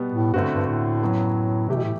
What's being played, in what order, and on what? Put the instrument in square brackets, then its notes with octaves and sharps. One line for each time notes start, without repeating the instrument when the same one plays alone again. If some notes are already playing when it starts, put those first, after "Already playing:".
Already playing: [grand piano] B2 G3 B3
[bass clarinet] A2
[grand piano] D2 D3 A3 C4 F#4 [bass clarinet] G2
[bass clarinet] G2
A2
[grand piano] F#2 F#3 B3
[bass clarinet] C3 [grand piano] E3 A3 E4 G4
[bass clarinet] B2
A2